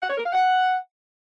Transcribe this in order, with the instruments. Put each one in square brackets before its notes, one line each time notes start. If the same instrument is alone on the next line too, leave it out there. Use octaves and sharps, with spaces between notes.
[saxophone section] F#5
C#5
A#4
F5
F#5